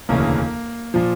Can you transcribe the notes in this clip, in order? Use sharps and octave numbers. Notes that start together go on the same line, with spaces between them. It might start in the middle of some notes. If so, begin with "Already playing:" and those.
E1 D2 C#3 E3 A#3
A#2 F3